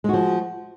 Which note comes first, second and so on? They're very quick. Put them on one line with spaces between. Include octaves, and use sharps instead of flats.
G#3 F#4 F3